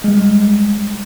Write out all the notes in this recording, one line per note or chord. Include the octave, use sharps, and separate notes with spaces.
G3 G#3